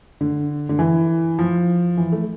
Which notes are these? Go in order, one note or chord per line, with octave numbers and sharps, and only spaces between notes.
D3
D3
E3
F3
E3
A3